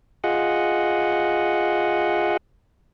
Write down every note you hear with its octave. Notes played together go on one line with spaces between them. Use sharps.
F4 G#4 D#5 F#5